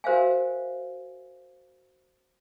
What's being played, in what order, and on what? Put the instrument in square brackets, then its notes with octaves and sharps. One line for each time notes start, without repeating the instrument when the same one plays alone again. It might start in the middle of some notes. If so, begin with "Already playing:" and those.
[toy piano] F#4 A#4 C5 E5 F5 G#5